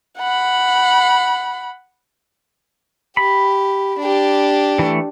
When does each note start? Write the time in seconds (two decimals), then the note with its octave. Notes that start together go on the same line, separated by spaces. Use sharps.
0.18 F#5 B5
3.17 G4 B5
3.99 D4 G4
4.79 E3 A3